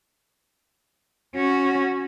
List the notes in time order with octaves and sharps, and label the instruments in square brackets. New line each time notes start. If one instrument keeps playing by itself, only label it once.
[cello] C#4 F#4